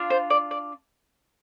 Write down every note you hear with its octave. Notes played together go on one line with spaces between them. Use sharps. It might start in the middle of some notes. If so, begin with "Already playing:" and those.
Already playing: D4 F4
C5
D5
D5